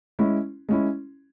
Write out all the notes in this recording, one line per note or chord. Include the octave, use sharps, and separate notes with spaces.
G#3 C#4 E4
G#3 C#4 E4